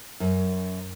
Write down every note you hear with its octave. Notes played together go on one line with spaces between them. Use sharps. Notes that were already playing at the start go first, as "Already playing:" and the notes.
F#2